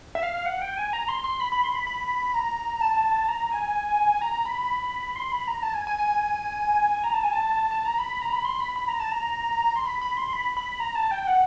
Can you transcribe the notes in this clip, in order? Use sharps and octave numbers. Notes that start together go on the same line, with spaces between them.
E5
F5
F#5
G5
G#5
A#5
C6
C6
B5
B5
C6
B5
B5
A#5
A5
A#5
G#5
A#5
B5
C6
B5
A#5
A5
G#5
G#5
G#5
A#5
A5
G#5
A5
A5
A#5
B5
A#5
B5
C6
B5
B5
A#5
A5
A#5
C6
B5
B5
C6
B5
B5
A#5
A5
G5
F#5